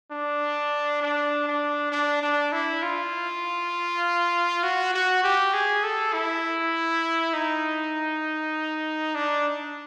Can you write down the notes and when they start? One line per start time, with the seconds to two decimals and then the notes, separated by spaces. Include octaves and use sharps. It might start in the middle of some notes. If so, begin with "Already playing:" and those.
0.11 D4
1.02 D4
1.48 D4
1.92 D4
2.22 D4
2.52 E4
2.82 F4
4.63 F#4
4.94 F#4
5.23 G4
5.53 G#4
5.84 A4
6.13 E4
7.34 D#4
9.15 D4